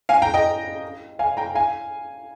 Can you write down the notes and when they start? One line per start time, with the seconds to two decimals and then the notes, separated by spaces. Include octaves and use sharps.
0.09 F5 G#5
0.22 G5 A#5
0.34 D#5 G5
1.19 F5 G#5
1.37 G5 A#5
1.55 F5 G#5